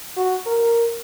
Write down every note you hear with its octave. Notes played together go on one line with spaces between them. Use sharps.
F#4
A#4